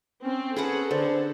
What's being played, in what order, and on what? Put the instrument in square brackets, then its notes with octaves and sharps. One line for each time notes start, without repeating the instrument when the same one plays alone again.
[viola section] C4 [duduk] C#4
[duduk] C#4 [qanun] G#4 B4 F#5 [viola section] A4
[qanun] D3 [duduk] C5